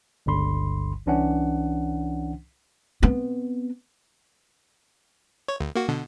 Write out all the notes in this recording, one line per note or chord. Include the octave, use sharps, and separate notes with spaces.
G1 C#2 G2 D3 B5 C6
C2 E3 C#4 D4 F#5
B3 C4
C#5
D2
A#3 F#4
B2 D3